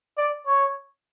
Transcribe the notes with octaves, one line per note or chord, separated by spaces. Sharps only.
D5
C#5